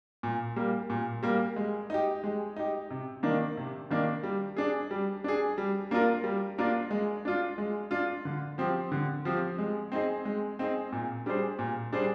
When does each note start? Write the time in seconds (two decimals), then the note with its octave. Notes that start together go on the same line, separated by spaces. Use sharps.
0.23 A#2
0.56 G3 A#3
0.90 A#2
1.23 G3 A#3
1.56 G#3
1.90 D#4 G4
2.24 G#3
2.56 D#4 G4
2.90 C3
3.23 D#3 A#3 D4
3.57 C3
3.91 D#3 A#3 D4
4.23 G3
4.57 D4 G#4
4.91 G3
5.24 D4 G#4
5.58 G3
5.91 A#3 D4 F4 A#4
6.24 G3
6.58 A#3 D4 F4 A#4
6.91 G#3
7.25 D4 F4
7.58 G#3
7.91 D4 F4
8.25 D3
8.58 F3 C4 G4
8.92 D3
9.25 F3 C4 G4
9.58 G#3
9.92 C4 D#4 G#4
10.25 G#3
10.59 C4 D#4 G#4
10.92 A#2
11.26 G3 D4 G#4 C5
11.59 A#2
11.93 G3 D4 G#4 C5